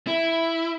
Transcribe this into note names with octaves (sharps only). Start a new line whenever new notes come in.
E4